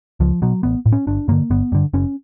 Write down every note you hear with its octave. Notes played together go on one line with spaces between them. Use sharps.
C#2 F3
B2 F#3
A1 B3
A2
C#4
G1 D4
G2 D3 A#3
G1 B3
G2 D3
F#1 C#4